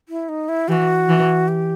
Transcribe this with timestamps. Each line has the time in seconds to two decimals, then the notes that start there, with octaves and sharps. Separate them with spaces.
0.09 E4
0.29 D#4
0.49 E4
0.68 E3 F#4 G4
1.09 E3
1.48 G4